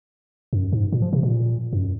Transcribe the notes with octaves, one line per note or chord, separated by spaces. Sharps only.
F#2
G#2
A#2
F3
C3
A#2
F#2